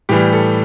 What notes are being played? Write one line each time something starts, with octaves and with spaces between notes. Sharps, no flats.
A2 E3 G3 G4
A4